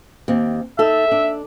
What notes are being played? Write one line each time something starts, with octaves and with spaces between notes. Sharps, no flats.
D#2 C4
D#4 A4 E5
D4